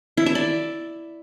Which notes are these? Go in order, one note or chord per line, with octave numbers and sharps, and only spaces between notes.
E4
E5
D5